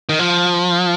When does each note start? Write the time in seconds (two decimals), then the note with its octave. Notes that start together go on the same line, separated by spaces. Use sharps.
0.09 D#3
0.19 F3